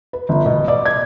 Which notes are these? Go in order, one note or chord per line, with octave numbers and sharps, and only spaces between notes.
B4
G1
B2
D5
G#6